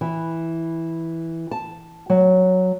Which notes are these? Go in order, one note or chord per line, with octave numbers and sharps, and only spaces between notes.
E3
A5
F#3